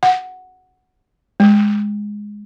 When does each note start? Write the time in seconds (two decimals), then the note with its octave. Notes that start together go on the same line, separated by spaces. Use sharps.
0.03 F#5
1.40 G#3